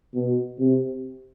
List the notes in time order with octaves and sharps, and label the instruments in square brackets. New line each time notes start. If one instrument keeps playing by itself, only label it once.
[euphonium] B2
C3